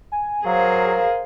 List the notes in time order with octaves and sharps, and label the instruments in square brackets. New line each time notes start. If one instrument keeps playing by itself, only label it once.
[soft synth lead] G#5
[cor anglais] F#3 [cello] G#4 C5 [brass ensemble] A#4 [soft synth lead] F5